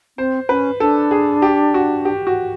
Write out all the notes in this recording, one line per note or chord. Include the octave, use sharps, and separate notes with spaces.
C4 C5
C#4 B4
D4 A4
G#4
G4
F#4
G4
F#4